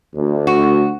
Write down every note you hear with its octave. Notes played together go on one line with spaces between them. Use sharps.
D2
F#4